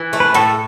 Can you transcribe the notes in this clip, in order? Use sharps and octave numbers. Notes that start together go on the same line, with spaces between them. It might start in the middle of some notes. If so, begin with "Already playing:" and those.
Already playing: E3
A3
B4
A2 A4